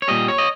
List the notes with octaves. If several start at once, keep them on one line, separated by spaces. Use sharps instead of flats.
C#5
A#2 G3 D#5
C#5
D#5